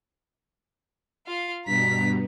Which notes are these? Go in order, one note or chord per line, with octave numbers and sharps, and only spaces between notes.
F4 F5
G2 B2 A#5 B6